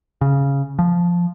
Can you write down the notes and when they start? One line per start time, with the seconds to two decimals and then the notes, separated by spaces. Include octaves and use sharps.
0.21 C#3
0.79 F3